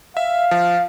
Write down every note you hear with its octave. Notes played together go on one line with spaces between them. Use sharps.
E5 F5
F3